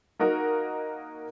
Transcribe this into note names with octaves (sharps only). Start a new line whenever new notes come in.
A#3 D#4 F#4 A#4